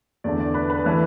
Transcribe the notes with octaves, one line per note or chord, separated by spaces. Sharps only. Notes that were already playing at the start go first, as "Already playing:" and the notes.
E2 D3 A3 D5
D5
B4
B4
E3 A3 B4